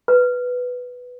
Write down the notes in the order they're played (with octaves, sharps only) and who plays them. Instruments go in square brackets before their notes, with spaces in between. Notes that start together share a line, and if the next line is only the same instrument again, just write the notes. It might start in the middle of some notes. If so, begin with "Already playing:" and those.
[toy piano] B4